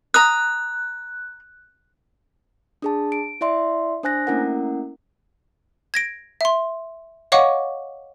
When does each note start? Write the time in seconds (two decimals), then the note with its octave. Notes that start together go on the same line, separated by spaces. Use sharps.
0.14 A#5 D#6 F#6
2.82 D4 G#4 A5
3.12 D7
3.41 E4 D5 E5 C6
4.03 D4 C5 G#5 F#6 A#6
4.27 A3 A#3 C#4 E4 A#4 F#5
5.94 G#6 A#6 D7
6.41 E5 C6
7.32 C#5 D#5 F5 F#5 C#6 D6